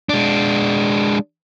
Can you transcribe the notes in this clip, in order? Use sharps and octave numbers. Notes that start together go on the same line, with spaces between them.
G#3 D4